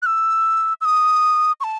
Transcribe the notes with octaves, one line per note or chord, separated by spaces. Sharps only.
F#6
E6
E6
D#6
C#6
A5